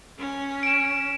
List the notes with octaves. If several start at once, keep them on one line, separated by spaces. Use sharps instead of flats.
C#4
D7 E7